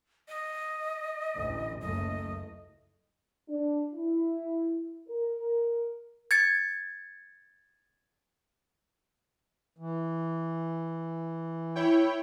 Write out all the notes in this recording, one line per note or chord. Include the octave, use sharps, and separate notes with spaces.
D#5
A1 D2
F#1 C#2 A3 D#5
D4
E4
A#4
G#6 A6 C#7
E3
E4 C#5 G5